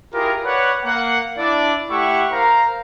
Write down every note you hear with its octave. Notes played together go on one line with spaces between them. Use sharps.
E4 F4 G4 G#4 A#4
B4 C#5 D5 F#5
A#3 F#5
D4 E4 D5
A3 E4 G4 E5 F#5 C#6
A#4 C5 F5 A#5